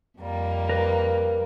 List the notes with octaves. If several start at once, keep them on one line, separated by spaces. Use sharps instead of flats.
F2 G3 A#3
A#4 B4